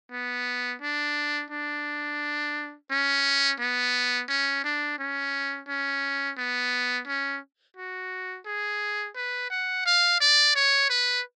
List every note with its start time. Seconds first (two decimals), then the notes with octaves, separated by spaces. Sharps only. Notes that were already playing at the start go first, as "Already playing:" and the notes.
0.12 B3
0.82 D4
1.50 D4
2.90 C#4
3.60 B3
4.29 C#4
4.64 D4
4.99 C#4
5.68 C#4
6.37 B3
7.07 C#4
7.76 F#4
8.46 G#4
9.15 B4
9.50 F#5
9.86 F5
10.21 D5
10.56 C#5
10.90 B4